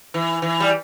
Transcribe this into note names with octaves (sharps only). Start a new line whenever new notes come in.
E3
E3
G3